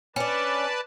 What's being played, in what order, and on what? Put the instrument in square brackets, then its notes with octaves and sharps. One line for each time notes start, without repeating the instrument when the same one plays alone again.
[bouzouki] C#4 D4 [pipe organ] B4 D5 A5